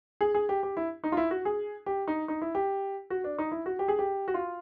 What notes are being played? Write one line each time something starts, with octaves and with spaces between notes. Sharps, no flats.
G#4
G#4
G4
G4
E4
D#4
F4
E4
F#4
G#4
G4
D#4
D#4
E4
G4
F#4
D4
D#4
E4
F#4
G4
G#4
G4
F#4
F4